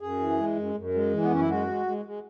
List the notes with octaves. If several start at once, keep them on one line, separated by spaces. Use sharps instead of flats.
F#2 G#4
E3
G#3
F#2
F#2
G#3
E3
B3
F#2 C#4
E4
G#3 F#4
G#3
G#3
G#3